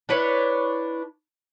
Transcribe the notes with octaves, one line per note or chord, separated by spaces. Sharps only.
D4 E4 B4 C#5